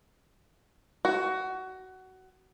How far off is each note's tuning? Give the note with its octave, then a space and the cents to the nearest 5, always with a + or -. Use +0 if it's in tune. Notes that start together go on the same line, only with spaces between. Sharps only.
F#4 +20